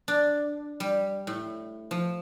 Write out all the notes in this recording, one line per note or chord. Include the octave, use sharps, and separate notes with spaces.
D4
G3
A2
F3